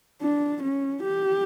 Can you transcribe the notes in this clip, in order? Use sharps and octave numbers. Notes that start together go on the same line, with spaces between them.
D4
C#4
G4